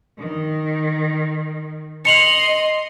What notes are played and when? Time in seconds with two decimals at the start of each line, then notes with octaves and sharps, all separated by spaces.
0.20 D#3
2.05 D#5 C6 C#7 F7 F#7